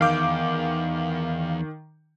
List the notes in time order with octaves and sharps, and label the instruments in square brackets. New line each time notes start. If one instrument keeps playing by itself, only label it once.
[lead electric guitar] E2 [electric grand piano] D#3 D6 G6 [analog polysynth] F5